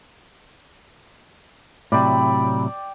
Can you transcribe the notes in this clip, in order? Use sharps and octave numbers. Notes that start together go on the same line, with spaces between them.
A2 C3 F#3 D5 G5 B5